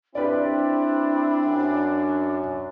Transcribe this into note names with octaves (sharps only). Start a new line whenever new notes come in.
C4 D4 E4 G4 B4 D5
F#2